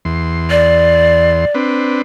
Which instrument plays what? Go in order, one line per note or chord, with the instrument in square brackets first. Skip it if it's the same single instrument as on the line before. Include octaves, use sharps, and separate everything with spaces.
[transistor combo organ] E2 C6
[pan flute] D5
[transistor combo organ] C4 D4 B4